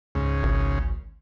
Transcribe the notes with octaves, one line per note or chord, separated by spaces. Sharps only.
C#2 G#2 C#3
G#1